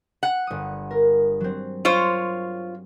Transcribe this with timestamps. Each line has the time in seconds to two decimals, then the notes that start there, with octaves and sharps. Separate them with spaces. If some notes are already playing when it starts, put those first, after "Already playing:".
0.23 F#5
0.47 G1 D#6
0.91 A#4
1.40 F#3 C4
1.85 F4 C5 C#5